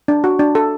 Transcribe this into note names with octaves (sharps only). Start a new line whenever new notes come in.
D4
F#4
D4
A4